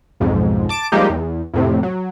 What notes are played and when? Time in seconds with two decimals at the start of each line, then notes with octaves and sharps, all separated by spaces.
0.20 B1 F2 G#2
0.69 A5 D6 D7
0.92 F3 G3 G#3 A#3 D#4 G4
1.10 E2
1.54 F2 A2 C3
1.83 F#3